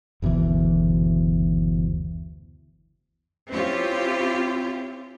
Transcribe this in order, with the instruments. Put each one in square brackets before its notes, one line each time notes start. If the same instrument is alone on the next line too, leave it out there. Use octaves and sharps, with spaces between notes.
[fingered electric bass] F#1 D2 B2 E3
[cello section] C4 C#4 E4 F4 G4